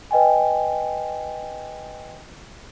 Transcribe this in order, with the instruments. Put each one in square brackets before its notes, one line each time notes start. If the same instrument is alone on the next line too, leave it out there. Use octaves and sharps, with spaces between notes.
[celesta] B4 D#5 G5 G#5